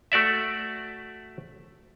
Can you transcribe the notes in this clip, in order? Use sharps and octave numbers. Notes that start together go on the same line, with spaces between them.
A3 F#4 D5 E5